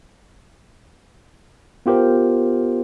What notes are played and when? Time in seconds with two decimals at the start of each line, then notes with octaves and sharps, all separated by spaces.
1.86 B3 F4 G4 A#4 C5